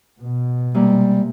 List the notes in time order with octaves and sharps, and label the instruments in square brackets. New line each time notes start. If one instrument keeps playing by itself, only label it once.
[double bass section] B2
[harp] C3 G#3 A#3 [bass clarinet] G3